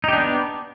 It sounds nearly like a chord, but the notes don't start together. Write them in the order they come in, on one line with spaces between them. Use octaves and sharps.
D#4 G4 D4 B3